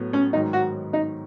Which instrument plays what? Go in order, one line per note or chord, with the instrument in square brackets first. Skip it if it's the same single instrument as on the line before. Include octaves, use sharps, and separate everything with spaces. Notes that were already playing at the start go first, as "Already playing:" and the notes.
Already playing: [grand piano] A2 F#3 B3
[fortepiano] C#4
[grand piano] G#2 D#3 F#3 [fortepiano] D#4
[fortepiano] F#4
D#4